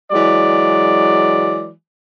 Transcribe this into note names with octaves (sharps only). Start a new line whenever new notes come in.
E3 F#3 G#3 D5